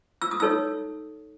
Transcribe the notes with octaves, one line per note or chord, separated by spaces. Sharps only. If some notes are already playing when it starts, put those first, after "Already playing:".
E6
D#6
D#4 A4 C#5 E6